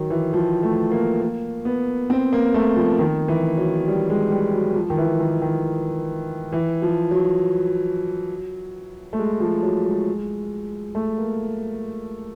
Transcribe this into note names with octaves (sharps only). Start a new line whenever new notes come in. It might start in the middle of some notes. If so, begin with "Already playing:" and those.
Already playing: D#3 F#3
E3
F3
A3
A#3
A#3
B3
C4
A#3
A3
F3
D#3
E3
F#3
G3
G#3
G3
F#3
F3
D#3
E3
D#3
D#3
E3
F3
F#3
A3
G#3
F3
F#3
G#3
A3
A#3